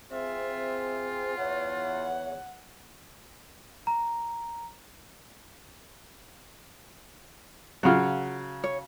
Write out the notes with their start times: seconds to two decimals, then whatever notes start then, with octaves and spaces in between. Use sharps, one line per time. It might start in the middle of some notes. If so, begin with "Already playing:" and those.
0.12 C4 F4 G#4 E5
1.38 E2 C#5 F#5
3.87 A#5
7.83 C#3 F#3 F4 F#5
8.64 C#5